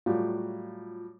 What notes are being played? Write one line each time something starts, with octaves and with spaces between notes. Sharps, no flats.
A2 F#3 G3 F4